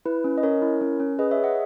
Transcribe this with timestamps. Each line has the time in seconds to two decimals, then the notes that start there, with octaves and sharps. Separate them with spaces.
0.05 E4 B4
0.24 C#4
0.38 D#5
0.43 C#4 A#4 C#5
0.62 E4
0.81 C#4
1.00 C#4
1.19 G#4 B4 D#5
1.31 C#5 E5
1.37 G#4
1.44 D#5 F#5